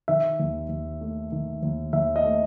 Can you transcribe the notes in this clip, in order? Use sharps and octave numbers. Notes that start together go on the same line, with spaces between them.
D#3 E5
D#2
D#2
A3
D#3
D#2
D#2 E5
D#5
A3